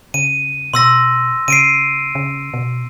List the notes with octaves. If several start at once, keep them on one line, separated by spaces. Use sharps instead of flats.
C#3 D#7
B2 C6 E6 A#6
C#3 C7 D7 D#7
C#3
B2